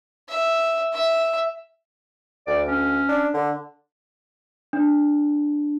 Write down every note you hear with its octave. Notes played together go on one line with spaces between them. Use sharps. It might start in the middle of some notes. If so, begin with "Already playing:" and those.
E5
E5
D2 D5
C#4
D4
D3
D4